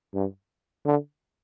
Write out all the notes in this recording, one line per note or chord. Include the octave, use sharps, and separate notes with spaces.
G2
D3